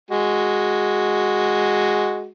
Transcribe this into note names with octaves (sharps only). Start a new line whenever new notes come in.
G#3 F#4